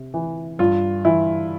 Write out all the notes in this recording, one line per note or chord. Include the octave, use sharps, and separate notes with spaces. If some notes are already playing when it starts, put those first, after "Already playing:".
Already playing: C3
E3
G2 F4
E3 E4